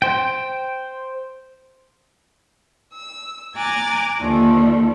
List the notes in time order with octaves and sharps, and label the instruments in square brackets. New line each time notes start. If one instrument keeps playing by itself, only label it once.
[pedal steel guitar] C5 G5
[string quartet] E6
G#5 A#5 D6 F#6 G#6 A6
D#2 D3 F3 A3 D4